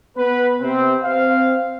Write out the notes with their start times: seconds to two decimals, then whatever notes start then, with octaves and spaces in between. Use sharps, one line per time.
0.16 B3 B4
0.61 C3 C4
1.04 C4 F5